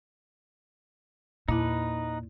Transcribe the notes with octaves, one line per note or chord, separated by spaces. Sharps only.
E2 A#2 D#4 E4 B4 A5